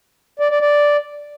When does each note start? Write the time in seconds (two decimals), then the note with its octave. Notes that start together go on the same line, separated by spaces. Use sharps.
0.40 D5
0.50 D5
0.60 D5